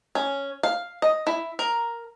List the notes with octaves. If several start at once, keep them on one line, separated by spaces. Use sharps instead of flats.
C#4
F5
D#5
E4
A#4